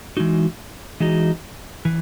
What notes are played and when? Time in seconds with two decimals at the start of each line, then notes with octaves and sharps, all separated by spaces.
0.17 E3 G#3 D#4 F#4
1.00 E3 G#3 D#4 F#4
1.85 E3